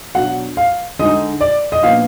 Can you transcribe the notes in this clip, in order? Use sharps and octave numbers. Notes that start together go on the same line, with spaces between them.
B2 F#3 D4 F#5
F5
D3 G#3 D#4 D#5
D5
D#5
A#2 F3 B3 D4 F5